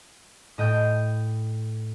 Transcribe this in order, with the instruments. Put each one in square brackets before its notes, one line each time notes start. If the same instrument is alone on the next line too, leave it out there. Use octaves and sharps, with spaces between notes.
[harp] A2 D#5 G5 G6